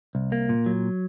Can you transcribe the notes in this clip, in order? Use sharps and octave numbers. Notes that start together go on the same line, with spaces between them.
C2
A#3
A#2
F#3